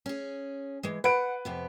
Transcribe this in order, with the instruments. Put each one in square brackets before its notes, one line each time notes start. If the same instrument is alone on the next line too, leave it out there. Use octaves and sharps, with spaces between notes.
[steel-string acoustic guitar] C#4 G#4
E3 G#3
[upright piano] B4 D7 [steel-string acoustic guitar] F#5
[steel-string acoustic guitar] F2 C3 B3